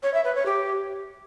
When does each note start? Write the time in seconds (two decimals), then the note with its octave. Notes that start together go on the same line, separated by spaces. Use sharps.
0.03 C#5
0.14 E5
0.24 B4
0.35 C#5
0.46 G4